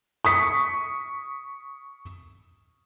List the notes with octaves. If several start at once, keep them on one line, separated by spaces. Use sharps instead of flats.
C#6 D#6 B6